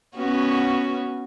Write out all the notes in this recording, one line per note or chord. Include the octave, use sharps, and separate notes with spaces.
B3 C#4 F#4